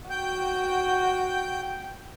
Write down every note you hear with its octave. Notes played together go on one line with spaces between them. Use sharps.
F#4 G5 G6